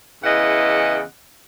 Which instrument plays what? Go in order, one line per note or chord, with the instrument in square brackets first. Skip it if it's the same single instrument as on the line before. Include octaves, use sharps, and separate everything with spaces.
[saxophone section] E2 C#3 E3 D#5 F#5